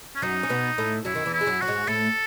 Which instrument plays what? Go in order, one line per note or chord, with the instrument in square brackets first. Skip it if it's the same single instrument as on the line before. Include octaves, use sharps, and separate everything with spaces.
[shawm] C#4
[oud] F#2 F#3 [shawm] D#4
[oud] C#4
B2 B3
A2 A3
[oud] F#2 F#3 [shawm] E4
[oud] D#3
E2 E3
[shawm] E4
[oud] G#3
F#2 F#3
[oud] F#3 [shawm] F#4
[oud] G#2 G#3
[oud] A2 A3 [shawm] A4